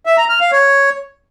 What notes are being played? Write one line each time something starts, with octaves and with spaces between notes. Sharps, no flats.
E5
A#5
F6
F5
C#5